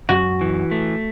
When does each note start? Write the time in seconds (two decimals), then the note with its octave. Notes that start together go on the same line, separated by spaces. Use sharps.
0.09 F#2 F#4
0.41 E3
0.71 A3